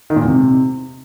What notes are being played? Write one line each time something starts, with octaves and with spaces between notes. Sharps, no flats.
D#3
A#2
E2
C3